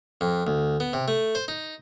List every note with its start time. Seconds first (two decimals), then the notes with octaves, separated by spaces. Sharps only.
0.21 F2
0.47 D2
0.80 B3
0.93 C3
1.08 A3
1.35 C5
1.48 D#4